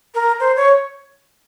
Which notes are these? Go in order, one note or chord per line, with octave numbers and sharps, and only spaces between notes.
A#4
C5
C#5